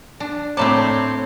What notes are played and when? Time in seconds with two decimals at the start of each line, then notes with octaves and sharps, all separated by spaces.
0.20 D4
0.57 A2 A3 C4 C#5 D5 A5 A#5 D6